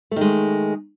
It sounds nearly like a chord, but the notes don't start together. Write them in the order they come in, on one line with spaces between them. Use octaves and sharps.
A3 D#3 G#3